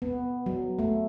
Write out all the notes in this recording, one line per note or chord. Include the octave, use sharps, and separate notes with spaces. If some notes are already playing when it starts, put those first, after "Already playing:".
B3
F#3
A3